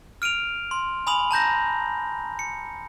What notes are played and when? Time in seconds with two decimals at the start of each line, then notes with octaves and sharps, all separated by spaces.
0.22 F6 D7 D#7 F7
0.71 C6
1.07 G#5 B5 D#6 F7 F#7
1.31 A5 A#5 G6 A#6
2.39 C#7